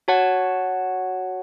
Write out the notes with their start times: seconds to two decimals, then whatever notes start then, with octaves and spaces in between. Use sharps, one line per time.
0.08 F#4 C#5 F#5 A5